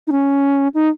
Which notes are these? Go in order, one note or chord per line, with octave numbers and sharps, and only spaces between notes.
D#4
C#4
D#4